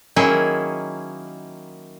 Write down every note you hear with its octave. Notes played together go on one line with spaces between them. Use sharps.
D#3 F#3 A#3 C#4 E4 G#4